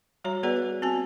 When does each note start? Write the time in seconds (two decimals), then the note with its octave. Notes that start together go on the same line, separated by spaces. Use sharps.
0.24 G3 F#4 C#5 A#5
0.43 B3 F#4 G#4 B4 D5 F#5
0.57 G#4
0.82 C4 F#4 G#5 A5